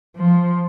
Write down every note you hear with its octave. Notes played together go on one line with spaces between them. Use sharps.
F3